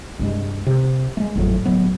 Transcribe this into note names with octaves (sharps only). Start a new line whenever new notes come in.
C2 G2 G#3
C3
G#3 A3
G#1 F2 A2 F#3
D1 F#3 B3